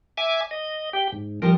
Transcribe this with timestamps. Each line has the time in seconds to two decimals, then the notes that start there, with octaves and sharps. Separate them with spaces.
0.18 E5 G#5 D6
0.51 D#5
0.93 G4 G5
1.12 G#2
1.42 F3 G3 A#4